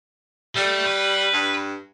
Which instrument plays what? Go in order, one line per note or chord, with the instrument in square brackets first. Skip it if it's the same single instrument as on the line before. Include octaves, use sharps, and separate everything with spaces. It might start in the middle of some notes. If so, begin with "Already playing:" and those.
[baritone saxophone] G3 [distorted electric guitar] A3
[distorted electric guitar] B4
[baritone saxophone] G2